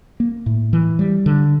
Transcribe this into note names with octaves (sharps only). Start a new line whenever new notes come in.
A#3
A2
E3
G3
D3